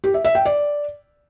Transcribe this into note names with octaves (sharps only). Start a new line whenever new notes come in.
G4
E5
E5
G5
D5